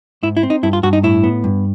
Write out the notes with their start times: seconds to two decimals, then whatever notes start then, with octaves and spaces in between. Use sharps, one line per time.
0.23 G#2 E4
0.37 E4
0.43 C4
0.50 D#4
0.63 G2 E4
0.73 F4
0.83 G2 F#4
0.93 D#4
1.03 A2 E4
1.24 B3
1.44 G2